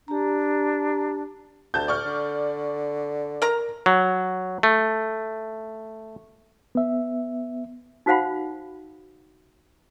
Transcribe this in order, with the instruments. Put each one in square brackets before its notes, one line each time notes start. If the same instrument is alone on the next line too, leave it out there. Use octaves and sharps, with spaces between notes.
[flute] D4 [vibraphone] G4 A#5
[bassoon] D2 [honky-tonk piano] A5 G6
[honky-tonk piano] D5 C#6 F6
[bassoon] D3
[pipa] A#4 A#5
[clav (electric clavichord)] F#3
A3
[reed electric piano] B3 E5
[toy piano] D#4 F#4 C5 F5 F#5 B5